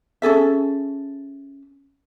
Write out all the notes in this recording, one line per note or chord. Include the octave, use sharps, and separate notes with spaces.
C#4 G#4 A4 E5